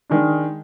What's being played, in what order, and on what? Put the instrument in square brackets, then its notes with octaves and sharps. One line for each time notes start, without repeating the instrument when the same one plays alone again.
[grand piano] D#3 G#3 D4